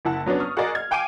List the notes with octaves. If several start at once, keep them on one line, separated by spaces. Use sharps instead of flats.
F#1 E4 F#5 A5
F#3 B3 C#4 D4
C#6 D#6 F6
F#4 G#4 A#4 D5 D#5
F6 G#6
F5 G5 G#5 D6 D7 D#7